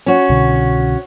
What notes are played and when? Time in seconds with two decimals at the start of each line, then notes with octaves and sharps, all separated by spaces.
0.06 C#4 F#4
0.29 C2 B2 D3